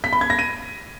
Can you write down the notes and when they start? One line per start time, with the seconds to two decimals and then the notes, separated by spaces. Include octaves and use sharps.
0.04 B6
0.13 B5
0.21 G#6
0.30 A#6
0.39 D#7